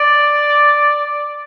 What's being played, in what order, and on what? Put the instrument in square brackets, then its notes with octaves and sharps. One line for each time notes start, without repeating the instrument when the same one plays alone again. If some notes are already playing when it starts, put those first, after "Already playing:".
Already playing: [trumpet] D5